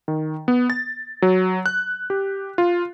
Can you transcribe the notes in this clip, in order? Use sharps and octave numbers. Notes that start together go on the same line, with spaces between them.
D#3
B3
A6
F#3
F#6
G4
F4